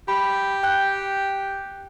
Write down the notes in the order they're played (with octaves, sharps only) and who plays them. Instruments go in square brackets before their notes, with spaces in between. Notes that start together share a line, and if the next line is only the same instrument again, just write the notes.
[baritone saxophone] G4 [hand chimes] B5
[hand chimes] G5 F#6 G6